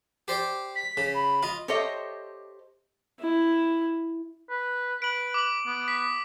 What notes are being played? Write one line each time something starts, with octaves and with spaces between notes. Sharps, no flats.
G4 C5 D5
B6
C#3
B5
F4 D#5
G4 A4 C5 C#5 D#5 E5
E4
B4
B4 D7 F#7
D6 F#7
B3
B6